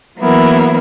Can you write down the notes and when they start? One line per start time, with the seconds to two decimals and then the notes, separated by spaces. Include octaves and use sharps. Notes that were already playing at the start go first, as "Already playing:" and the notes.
0.18 E3 F#3 A#3 B3 E4 A#4